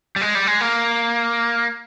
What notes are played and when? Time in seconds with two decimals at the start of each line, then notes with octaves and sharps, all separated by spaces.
0.16 G3
0.21 G#3
0.35 G3
0.47 G#3
0.61 A#3